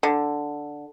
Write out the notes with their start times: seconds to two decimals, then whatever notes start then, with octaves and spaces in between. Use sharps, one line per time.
0.03 D3